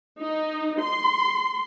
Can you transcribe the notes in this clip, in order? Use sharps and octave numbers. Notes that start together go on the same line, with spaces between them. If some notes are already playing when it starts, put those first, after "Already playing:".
D#4
C6